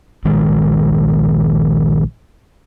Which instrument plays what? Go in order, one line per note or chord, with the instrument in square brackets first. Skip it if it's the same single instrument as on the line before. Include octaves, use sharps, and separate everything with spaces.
[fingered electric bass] A#1 D#3 G#3